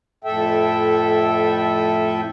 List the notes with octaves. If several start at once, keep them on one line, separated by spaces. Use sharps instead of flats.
F2 A2 A4 E5 G5